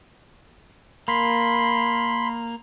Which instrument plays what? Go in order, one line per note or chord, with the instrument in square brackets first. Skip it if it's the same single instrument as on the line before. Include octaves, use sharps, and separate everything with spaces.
[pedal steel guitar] A#3 [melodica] B5 C6